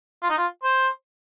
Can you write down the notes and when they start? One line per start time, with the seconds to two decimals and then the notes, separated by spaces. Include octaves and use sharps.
0.23 F4
0.30 D#4
0.38 F4
0.64 C5